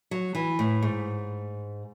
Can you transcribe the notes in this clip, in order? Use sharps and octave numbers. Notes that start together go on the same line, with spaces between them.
F#3
E3
A2
G#2